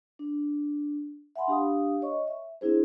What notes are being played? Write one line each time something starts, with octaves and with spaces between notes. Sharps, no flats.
D4
E5 F#5 G#5 B5 C6
D4 G4 F5 D#6
C#5 D#5 C#6
E5
C4 D4 E4 G#4 C5